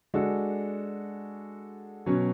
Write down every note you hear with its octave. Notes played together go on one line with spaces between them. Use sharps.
G#3 D4 F#4 A4
B2 F#3 C#4